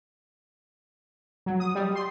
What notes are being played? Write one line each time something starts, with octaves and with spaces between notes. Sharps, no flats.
F#3
D#6
G3
C6